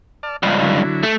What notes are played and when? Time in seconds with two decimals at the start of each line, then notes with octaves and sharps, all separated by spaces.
0.23 D5 A5 F6
0.43 C#2 G2 F4
0.62 D3 F#3 E4
1.03 A3